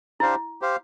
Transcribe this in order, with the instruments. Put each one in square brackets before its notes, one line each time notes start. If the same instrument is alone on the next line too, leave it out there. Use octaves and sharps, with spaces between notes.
[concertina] D4 G4 C5 F5 [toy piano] E4
[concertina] G4 C5 F5